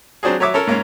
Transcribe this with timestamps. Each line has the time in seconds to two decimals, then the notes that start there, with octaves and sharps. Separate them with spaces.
0.23 F#3 C4 D4 F#4 G#4
0.40 F#3 C#5 E5 D6
0.54 C#4 A4 A#4
0.67 G#2 A#3 C#4